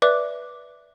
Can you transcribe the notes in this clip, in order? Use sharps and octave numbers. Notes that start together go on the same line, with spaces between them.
B4 D5 E5 D6 F#6